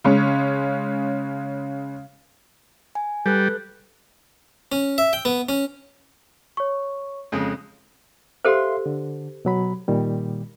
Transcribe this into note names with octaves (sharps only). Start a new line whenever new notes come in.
C#3 G#3 C#4
G#5
G3 A4 B4 F#6
C#4
E5
G5
B3
C#4
C#5 C#6
F2 C#3 G#3
G4 A4 C5 E5 F5 C6
D3
B2 F#3 B5
A#2 D#3 G3